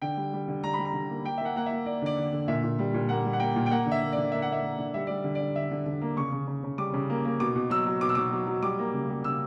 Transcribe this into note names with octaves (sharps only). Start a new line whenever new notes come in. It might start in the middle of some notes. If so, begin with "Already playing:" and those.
D3 G5
G3
G3
D3
G3 A#5
B5
G3
A#5
D3
A#3
A#3 G5
E5
A#3 F#5
A#3 F#5
A#3 E5
A#3 D5
D3 D5
D3
D3
A#2 E5
A#2
G3
A#2
A#3 F#5
G3
F#5
A#3 G5
A#2
G5
A#3 F#5
D3
E5
A#3
D3 D5
A#3 E5
F#5
A#3 E5
A#3
D3
G3 E5
G3 D5
D3
D5
D3
D3 E5
D3
D3
A#3
C#3 C#6
C#3
C#3
C#3
G3 D6
C#3
A#3
A#3
B2 D6
B2
F#3 E6
F#3
B2 D6
E6
B2 D6
F#3
F#3
G3 D6
A#3
C#3
G3
C#3 E6